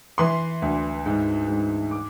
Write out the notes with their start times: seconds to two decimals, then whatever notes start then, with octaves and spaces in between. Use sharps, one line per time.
0.18 E3 C6
0.62 D2
1.06 G#2
1.48 G#2
1.91 D6